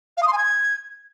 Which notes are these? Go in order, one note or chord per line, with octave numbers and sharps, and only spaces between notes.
F5
D#6
C6
G#5
G#6